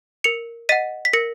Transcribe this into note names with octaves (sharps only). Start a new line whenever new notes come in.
A#4 C#7 F7
D#5 F#5 B6 D#7
B6
A#4 A#6 C#7